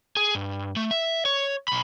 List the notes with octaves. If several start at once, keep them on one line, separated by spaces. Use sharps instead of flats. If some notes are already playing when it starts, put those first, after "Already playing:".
G#4
G2
A3
E5
C#5
B1 B5